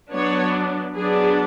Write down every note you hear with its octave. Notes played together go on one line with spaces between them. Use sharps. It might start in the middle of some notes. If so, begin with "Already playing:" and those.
F#3 B3 D4 C#5
F#3 B3 D4 G#4